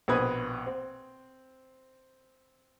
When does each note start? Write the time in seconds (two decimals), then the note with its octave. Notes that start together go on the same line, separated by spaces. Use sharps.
0.08 A#1 B2 C4 B4 D#6 G#6
0.66 C4